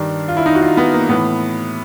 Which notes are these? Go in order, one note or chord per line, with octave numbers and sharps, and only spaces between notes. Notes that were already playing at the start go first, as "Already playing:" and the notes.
Already playing: G2 D#3 D4
F4
E4
D#4
F#4
F4
B3
A#3
A2 E3 B3